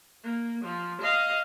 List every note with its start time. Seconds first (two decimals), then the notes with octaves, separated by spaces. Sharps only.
0.24 A#3
0.64 F3
1.01 D#5 F5